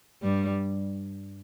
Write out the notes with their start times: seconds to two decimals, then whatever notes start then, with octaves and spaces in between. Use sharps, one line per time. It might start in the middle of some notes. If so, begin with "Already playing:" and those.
0.23 G2 G3